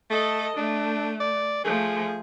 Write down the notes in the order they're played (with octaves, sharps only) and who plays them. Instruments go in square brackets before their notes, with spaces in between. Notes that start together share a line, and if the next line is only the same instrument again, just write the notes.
[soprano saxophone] A3 [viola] A4 D#5
[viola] A3 [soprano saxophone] D4
[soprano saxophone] D5
[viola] F3 A3 [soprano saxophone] G#4